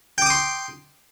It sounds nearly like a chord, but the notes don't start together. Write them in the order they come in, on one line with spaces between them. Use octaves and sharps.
G5 D6 D#6 C6